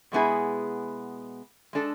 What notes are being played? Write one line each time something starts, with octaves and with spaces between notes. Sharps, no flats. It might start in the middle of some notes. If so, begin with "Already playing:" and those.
B2 G#3 B3 E4 G#4
G#3 D4 A4